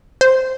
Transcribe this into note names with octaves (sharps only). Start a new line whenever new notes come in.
C5